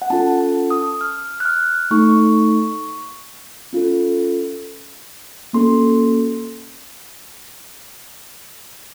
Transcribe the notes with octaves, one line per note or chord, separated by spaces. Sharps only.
F#5
C#4 F4 A4 A5
A5
D#6
F6
F#6
F6
A3 D#4 A4 C#6
C#4 F4 A4
A#3 C#4 F#4 A4 C6